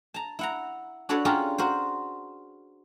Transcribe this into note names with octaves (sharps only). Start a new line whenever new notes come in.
A5 A#5
E4 F#5 A#5
D4 F#4 A4 B4 C#5 D5
C#4 D4 F4 G4 G#4 A#4
F#4 A#4 C5